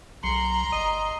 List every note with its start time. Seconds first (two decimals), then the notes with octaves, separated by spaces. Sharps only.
0.24 B1 F#3 A#5 C6
0.72 G1 D#5